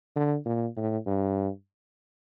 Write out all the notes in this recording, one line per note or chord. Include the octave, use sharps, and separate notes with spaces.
D3
A#2
A2
G2